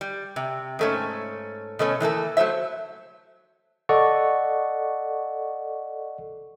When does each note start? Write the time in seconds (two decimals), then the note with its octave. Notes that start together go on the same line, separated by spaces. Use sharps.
0.01 G3
0.36 C3
0.79 G#2 A3 C#4
1.79 B2 A3 C#4
2.00 E3 A3 A#3 A4
2.37 F#3 A3 C5 E5
3.89 A4 D5 D#5 F#5 C#6